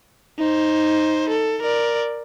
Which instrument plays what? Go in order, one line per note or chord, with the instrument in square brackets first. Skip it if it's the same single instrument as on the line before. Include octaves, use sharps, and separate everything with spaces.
[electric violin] D#4 C5
A4
A#4 D5